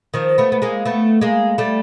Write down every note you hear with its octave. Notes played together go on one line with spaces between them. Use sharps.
D#3 F3
A3 B3
B3
G#3 A#3
A3 B3
G#3 A#3
G3 A3